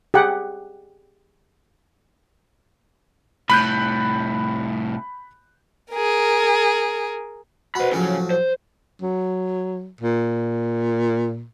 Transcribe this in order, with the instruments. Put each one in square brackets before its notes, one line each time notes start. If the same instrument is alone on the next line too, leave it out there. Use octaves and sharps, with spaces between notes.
[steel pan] G4 G#4 F#5
[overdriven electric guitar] C2 A2 [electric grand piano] B5 F#6 G6
[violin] G#4 A#4
[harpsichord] B2 F#4 [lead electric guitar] C5 B5
[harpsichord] A2 F3 F#3 [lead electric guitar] C#3
[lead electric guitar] C5
[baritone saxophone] F#3
A#2